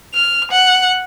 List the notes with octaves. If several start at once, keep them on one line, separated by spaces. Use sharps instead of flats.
F6
F#5